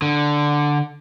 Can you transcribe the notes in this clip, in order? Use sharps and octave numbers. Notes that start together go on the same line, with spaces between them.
D3